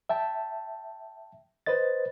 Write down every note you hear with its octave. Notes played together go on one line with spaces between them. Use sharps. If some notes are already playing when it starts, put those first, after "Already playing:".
E5 G5 A5
B4 C5 D#5 A6